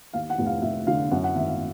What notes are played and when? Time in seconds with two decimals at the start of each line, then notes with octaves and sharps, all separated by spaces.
0.13 D#2 F5
0.30 F#5
0.38 F1
0.46 F5
0.62 F1 E5
0.87 D3 F5
1.11 F#2 F#5
1.24 F#5
1.35 G#1 E5
1.48 F5